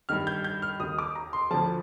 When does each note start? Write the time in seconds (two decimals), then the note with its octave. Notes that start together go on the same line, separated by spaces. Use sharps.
0.09 G2 D#3 F6
0.27 G6
0.44 G6
0.62 F6
0.80 D#2 D#3 D#6
0.99 D6
1.15 A#5
1.33 C6
1.51 D2 D3 F3 A5